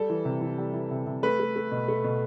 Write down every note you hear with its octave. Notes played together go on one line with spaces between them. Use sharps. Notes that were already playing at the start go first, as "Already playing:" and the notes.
Already playing: G3 A4
E3
C3
E3
G3
E3
C3
C3
A3 B4
A3
A3
B2
A3
B2